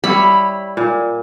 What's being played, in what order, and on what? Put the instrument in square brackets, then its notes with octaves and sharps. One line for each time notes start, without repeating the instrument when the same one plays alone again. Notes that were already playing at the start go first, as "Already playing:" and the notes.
[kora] G3 E4 C#5 [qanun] B5
[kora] A#2